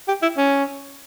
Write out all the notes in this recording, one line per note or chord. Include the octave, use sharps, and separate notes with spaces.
G4
E4
C#4